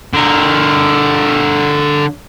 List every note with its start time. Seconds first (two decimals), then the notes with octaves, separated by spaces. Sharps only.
0.13 D3 A#4